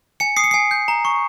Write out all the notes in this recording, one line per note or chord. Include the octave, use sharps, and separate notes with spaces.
G#5 C#7
D#6 C7
C#7
G#5 C7
G6
A#5
C#6